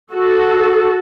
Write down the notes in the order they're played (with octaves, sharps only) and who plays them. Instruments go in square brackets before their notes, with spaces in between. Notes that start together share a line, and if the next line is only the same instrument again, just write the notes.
[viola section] F#4 A4